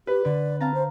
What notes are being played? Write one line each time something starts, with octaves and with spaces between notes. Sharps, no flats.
G4 B4
D3 D5
C4 F5 A5 A#5
C5